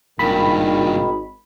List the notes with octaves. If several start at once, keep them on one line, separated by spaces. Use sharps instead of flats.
G#1 G2 A#2 D#3 B5